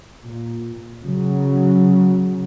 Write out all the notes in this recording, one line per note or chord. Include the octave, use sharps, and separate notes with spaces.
A#2
C#3 F#3